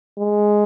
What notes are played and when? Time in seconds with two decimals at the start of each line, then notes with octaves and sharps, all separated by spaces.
0.18 G#3